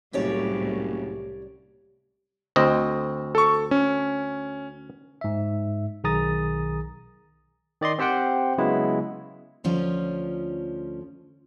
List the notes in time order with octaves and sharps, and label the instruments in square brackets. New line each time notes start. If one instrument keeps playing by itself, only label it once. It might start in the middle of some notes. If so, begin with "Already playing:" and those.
[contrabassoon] F#1 [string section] C2 A2 [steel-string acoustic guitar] G4 C#5 D5
[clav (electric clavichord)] D2 C4 D#5
[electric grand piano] A4 C#6
C#4
[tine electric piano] G#2 E5
B1 D#3 G#4 A#5 D#6 A6
D#3 D5 D#5 C6
C4 G4 C5 F#5 G5
C#3 F#3 G#3 B3 E4
[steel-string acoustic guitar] D2 F3 C#4 F4